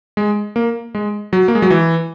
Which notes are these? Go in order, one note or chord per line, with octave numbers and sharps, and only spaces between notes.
G#3
A#3
G#3
F#3
A#3
G#3
F#3
E3